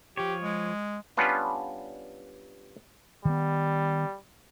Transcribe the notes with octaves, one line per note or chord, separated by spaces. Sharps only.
F3 G4 C#5
G#3
G3 B3 C#4 D4 F4 B4
D#3 G3 B3